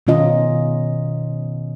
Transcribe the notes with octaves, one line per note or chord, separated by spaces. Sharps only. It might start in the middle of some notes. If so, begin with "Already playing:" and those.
B2 D#3 C#4 F4 D#5